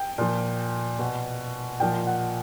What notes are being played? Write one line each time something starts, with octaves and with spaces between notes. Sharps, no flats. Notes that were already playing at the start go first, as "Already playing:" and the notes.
Already playing: G5
A#2 F3
B2
A#2 F3 G5
F#5